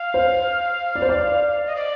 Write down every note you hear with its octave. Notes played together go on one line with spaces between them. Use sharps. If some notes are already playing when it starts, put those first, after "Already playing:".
Already playing: F5
C5
D5
C5
D5
D#5
D5